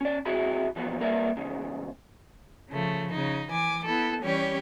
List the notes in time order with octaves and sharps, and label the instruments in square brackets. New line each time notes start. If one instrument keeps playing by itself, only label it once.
[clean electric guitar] C#4 D5
C#2 C3 E4 F#4 G#4 B5
B2 E3 F3 B3
G3 A#3 A#4 B4 D5 E5
E2 G#2 C#3
[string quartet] C#3 F3 A3
C#3 D#4
E3 G#5 D6
B3 E4 A4
E3 G3 C#4 G4 C#5